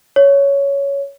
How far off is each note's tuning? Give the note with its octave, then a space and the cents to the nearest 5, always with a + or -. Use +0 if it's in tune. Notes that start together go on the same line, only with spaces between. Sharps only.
C#5 +10